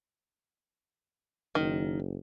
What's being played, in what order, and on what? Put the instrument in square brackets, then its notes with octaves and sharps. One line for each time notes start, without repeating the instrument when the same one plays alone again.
[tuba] F#1 [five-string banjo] D#3